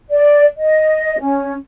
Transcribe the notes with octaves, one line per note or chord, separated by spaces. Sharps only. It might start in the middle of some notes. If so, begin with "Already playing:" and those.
D5
D#5
C#4